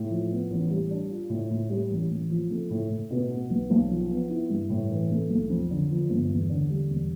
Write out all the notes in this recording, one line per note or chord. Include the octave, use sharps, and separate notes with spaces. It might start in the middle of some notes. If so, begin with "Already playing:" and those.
Already playing: A2
F3
B3
A1
G3
D4
F4
A2
A2
G3
A1
A1
F3
A3
A2
A2
B2
B3
B1
B1
F3
B3
E4
G2
A2
E3
A3
B1
F2
D3
F3
G1
E2
D3
G3
E1